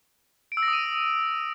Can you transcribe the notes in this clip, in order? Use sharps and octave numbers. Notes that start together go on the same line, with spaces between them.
D7
E6
A#6
D#6
D#7